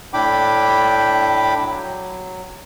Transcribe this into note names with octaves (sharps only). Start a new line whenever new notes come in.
A2 D4 E4 G5 B5 D6
F#3